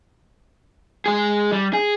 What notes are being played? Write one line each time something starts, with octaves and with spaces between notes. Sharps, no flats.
G#3 G#4
G3
G#4